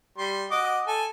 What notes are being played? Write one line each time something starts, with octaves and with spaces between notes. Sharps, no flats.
G3 C6
F#4 D#5 D6
A4 G#5